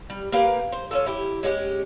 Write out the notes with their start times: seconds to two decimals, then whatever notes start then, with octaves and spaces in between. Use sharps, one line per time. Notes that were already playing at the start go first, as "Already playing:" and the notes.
0.10 G3
0.32 A#3 G4 B4 F5
0.72 C5
0.91 C#4 F4 A4
1.06 E4 G4
1.43 G#3 C#4 E4 G4